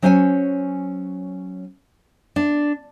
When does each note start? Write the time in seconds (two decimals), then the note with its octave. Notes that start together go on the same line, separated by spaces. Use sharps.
0.02 F#3 C#4 C5 C#5 F5 G#5
2.36 D4